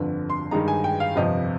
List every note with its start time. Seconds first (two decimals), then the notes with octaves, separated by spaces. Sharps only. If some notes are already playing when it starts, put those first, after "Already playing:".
Already playing: G1 F2 D3
0.30 C6
0.51 G2 D#3 G#3 D#4 A#5
0.68 G#5
0.84 G5
1.00 F5
1.16 G1 F2 C3 F3 D#5